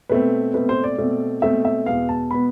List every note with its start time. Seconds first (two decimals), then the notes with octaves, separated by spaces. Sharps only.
0.09 B2 A3 C4 B4
0.54 B2 A3 C4 B4
0.69 C5
0.84 D5
0.98 B2 A3 C4
1.42 B2 A3 C4 E5
1.65 E5
1.86 E2 B2 B3 F5
2.09 A5
2.31 B2 B3 B5